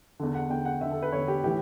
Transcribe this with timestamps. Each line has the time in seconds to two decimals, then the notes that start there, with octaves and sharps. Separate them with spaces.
0.20 E2 D3
0.35 F#5
0.50 E2 D3 G5
0.65 F#5
0.81 E2 D3 E5
0.92 A4
1.03 B4
1.12 E2 D3 C#5
1.28 G4
1.44 A2 E3 G4